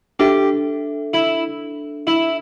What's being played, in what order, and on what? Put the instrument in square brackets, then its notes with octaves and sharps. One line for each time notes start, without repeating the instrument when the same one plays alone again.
[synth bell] D4 A4 E5 [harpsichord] G4
[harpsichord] E4
E4